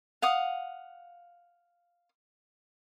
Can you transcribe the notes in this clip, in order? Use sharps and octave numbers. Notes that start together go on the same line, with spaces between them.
F5 F#5 D#6